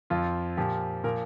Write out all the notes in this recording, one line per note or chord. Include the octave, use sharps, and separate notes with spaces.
F2 F3 F4
A#2 F3 G4
A#2 F3 A#4